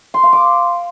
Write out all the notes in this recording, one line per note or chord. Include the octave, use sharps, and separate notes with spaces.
C6
F5
D6